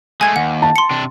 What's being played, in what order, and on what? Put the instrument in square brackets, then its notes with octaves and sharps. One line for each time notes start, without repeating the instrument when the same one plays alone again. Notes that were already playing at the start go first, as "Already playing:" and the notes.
[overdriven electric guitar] G#3 A3 [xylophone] G#5 G#6
[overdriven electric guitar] D#2 [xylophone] F#5
[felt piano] A5
[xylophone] C6 C#7
[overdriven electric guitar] C3 D4